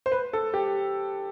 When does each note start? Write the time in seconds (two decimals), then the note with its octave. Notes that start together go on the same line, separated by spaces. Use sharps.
0.06 C5
0.12 B4
0.33 A4
0.54 G4